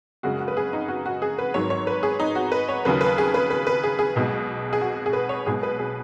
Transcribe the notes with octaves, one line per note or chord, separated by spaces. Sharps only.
F#2 C#3 G#3 F#4
F#4
B4
G#4
D#4
F#4
F#4
G#4
B4
G#1 G#2 F#3 C#5
C#5
B4
G#4
D#4
F#4
B4
C#5
D#2 C#3 F#3 B4
B4
G#4
B4
B4
B4
G#4
G#4
B1 B2 G#3
G#4
F#4
G#4
B4
C#5
B1 B2 G#3 G#4
B4
G#4